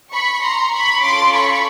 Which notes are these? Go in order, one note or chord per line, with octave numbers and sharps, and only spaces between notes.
B5 C#6
A#5 C6
B5 C#6
C#4 F4 A4 C6 D6
B5 C#6